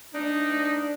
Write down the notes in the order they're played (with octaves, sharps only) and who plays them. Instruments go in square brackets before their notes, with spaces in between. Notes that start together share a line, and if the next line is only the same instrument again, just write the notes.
[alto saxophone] D4 [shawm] D#4